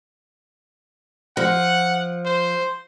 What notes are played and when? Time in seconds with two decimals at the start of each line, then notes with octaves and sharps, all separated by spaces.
1.37 F3 F#5
2.25 C5